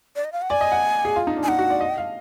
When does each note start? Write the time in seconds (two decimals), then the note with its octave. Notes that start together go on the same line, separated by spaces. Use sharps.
0.16 D5
0.25 D#5
0.32 F5
0.42 F#5
0.50 D5 G#5
0.61 D#5
0.72 F#5
1.05 G#4
1.16 F4
1.27 D#4
1.37 D4
1.43 G#5
1.48 D#4 F#5
1.59 F#4
1.70 D5
1.81 D#5
1.98 F5